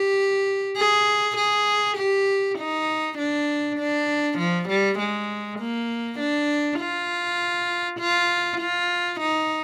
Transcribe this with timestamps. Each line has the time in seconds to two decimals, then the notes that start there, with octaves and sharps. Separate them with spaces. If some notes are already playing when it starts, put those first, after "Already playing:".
Already playing: G4
0.77 G#4
1.37 G#4
1.98 G4
2.59 D#4
3.18 D4
3.78 D4
4.38 F3
4.69 G3
4.99 G#3
5.59 A#3
6.19 D4
6.80 F4
8.00 F4
8.60 F4
9.21 D#4